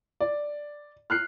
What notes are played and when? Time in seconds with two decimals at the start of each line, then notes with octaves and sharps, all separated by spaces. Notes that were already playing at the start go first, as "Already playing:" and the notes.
0.20 D5
1.10 F6 F#6 C7